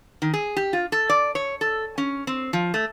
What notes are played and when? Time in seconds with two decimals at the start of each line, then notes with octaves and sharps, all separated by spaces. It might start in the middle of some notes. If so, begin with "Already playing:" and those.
0.22 D#3
0.34 G#4
0.57 G4
0.73 F4
0.92 A4
1.09 D5
1.35 C#5
1.61 A4
1.98 C#4
2.27 C4
2.53 F3
2.74 A3